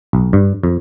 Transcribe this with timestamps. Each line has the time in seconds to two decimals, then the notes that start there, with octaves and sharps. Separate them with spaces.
0.13 B1
0.33 G2
0.63 F2